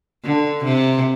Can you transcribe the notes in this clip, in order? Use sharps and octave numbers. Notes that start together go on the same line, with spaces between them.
D3
C3